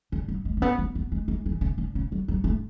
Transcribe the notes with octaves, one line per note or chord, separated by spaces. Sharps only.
D3
F#3
G#3
A3
B3
B3
B3
G#3
G#3
E3
C#3
D3
C#3
F#3
F#3
A3